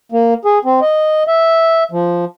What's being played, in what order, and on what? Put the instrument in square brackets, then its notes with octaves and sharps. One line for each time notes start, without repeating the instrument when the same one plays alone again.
[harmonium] A#3
G#4
C4
D#5
E5
F3